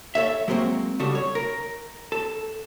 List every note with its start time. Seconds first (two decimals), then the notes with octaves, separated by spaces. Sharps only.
0.15 A4 C#5 E5
0.48 F#3 G#3 A#3 C4 F#4
0.99 C#3 G3 F#4 A4
1.15 C#5
1.35 A#4
2.12 A4